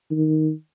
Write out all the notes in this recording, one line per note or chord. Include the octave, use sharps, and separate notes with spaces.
D#3